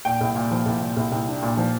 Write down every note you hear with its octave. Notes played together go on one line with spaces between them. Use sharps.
A#2 G5
C2
A#2
F3
C2
A#2
C2
C2
D4
A#2
F3